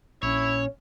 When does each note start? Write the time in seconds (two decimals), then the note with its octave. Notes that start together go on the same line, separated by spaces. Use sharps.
0.23 A#1 C#4 E4 C#5